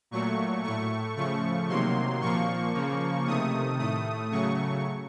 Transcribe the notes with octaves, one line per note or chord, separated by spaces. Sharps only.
A#2 F#3 A3 C#6
A2 A3 C#6
C#3 F3 A3 C#6
C3 D#3 F#3 A#3 C6
A#2 F3 A#3 C#6
C#3 F3 A#3
C3 D#3 A3 D#6
A2 A3 D#6
C#3 F#3 A3 C#6